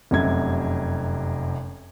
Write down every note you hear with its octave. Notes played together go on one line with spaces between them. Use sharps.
F1 F#2 C3 G#6